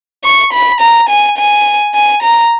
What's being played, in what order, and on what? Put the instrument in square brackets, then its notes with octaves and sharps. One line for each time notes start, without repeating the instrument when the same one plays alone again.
[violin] C#6
B5
A#5
G#5
G#5
G#5
A#5